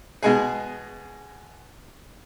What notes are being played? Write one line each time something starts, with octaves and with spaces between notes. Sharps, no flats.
B2 G#3 G#4